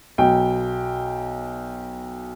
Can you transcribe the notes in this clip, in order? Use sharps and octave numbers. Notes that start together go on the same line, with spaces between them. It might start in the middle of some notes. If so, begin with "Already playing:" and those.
B1 G5